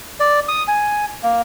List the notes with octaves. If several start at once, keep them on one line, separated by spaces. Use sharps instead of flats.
D5
D#6
G#5
A#3